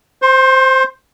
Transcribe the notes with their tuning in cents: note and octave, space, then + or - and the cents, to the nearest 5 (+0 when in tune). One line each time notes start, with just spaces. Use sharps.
C5 +0 C6 +35